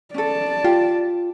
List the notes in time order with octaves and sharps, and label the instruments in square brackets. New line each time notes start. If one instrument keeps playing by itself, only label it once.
[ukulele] C#4 A4 [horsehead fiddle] D5 A5
[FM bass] F4 [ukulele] G4